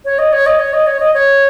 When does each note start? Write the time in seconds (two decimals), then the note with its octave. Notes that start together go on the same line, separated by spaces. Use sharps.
0.05 C#5
0.18 D#5
0.32 C#5
0.46 D#5
0.59 C#5
0.73 D#5
0.87 C#5
1.00 D#5
1.14 C#5